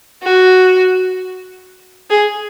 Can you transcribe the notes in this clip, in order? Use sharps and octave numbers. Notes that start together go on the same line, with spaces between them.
F#4
G#4